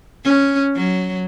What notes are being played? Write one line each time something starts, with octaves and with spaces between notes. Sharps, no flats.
C#4
F#3